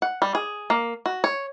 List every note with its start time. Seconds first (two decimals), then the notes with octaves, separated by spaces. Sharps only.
0.02 F#5
0.22 G3
0.35 G#4
0.70 A#3
1.06 F#4
1.24 C#5